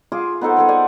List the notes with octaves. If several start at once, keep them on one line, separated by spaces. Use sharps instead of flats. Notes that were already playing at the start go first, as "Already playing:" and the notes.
F4 G#4 D6
B3 D#4 A4 C5
G#4 A4 G5
D5 F#5 G#5